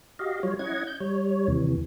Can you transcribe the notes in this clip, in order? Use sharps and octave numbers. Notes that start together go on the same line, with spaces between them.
F#4 G4 D#5 F5
F#3 G3 F4 C#5
C#4 E4 D#5 F#5 G#6
G6
G3 C#5
D#2 C3 E3